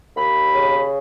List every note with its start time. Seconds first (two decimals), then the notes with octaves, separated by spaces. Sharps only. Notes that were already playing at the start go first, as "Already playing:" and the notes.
0.17 D#2 B5
0.54 C#3